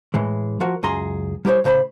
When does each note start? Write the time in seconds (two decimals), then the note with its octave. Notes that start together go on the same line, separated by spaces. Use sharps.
0.14 A2 E3 G#3
0.60 F3 F4 F#4 A#4
0.83 C#2 F#2 G#4 A#5 C6
1.45 G3 E4 G4 A#4 C5 C#5
1.64 A2 C#3 C5 A5 B5